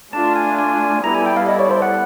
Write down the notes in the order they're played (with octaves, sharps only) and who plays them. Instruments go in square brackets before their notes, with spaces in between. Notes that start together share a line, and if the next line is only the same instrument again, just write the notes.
[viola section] A3 D4 F4 [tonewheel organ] A5
[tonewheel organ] G#5
G#5
[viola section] G3 B3 E4 A4 D5 [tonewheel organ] A#5
[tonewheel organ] G#5
G5
F5
D#5
C#5
C5
F#5